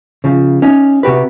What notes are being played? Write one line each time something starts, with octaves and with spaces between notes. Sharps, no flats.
C#3 F3
C#4 D#4
C3 F#4 G4 B4